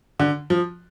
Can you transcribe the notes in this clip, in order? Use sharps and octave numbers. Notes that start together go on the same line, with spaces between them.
D3
F3